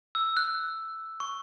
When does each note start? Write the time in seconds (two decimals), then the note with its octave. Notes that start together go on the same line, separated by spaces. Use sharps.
0.15 E6
0.37 F#6
1.20 C#6